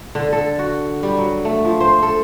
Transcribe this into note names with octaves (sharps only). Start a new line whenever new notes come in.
D3
A4
F#4
G3
F#3
A3
F3
C5
A4